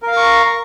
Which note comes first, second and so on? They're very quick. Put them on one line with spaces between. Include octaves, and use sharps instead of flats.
A#4 F5 A#5 C#6